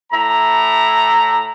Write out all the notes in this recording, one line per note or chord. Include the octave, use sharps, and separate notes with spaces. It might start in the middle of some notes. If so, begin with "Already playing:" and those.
A2 E4 A#5